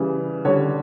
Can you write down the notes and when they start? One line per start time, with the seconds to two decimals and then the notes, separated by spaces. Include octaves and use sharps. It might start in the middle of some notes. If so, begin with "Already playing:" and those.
Already playing: C#3 E3 G3
0.45 D3 G3 C#5